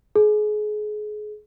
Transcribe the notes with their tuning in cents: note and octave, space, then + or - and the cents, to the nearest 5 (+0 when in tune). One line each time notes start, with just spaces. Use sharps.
G#4 +30